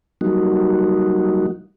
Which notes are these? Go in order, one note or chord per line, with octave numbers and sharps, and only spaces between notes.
F#3 G3 A#3 D#4 F#4